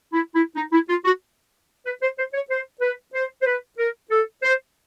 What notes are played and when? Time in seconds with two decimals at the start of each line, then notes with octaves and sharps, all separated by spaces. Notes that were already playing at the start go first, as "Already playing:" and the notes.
0.13 E4
0.34 E4
0.56 D#4
0.73 E4
0.89 F4
1.05 F#4
1.86 B4
2.02 C5
2.18 C5
2.34 C#5
2.50 C5
2.81 B4
3.14 C5
3.42 C5
3.46 B4
3.78 A#4
4.11 A4
4.43 C5